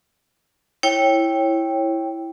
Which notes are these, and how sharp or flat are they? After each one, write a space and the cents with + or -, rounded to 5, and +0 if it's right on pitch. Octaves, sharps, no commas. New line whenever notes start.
E4 +0 C#5 -20 G5 +0